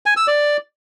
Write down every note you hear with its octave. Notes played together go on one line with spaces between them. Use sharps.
G#5
E6
D5